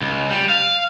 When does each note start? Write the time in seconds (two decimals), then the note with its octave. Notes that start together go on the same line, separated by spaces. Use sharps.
0.02 C#2
0.30 G3
0.49 F5